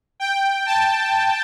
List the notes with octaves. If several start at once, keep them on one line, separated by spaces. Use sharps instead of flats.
G5
A5